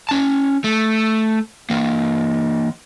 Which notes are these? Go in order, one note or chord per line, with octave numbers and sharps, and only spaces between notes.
C#4 A5
A3
E3 A#3